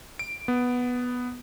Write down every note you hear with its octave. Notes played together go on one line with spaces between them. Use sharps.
D7
B3